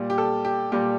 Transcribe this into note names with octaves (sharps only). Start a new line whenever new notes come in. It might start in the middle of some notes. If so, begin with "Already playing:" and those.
Already playing: A#2 G3
G4
A4
G4
A#2 G3 G4